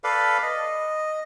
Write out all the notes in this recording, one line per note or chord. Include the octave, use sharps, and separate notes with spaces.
A4 B4 D5 F5
D#5